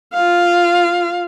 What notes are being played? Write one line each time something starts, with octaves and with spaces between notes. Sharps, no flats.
F4 F5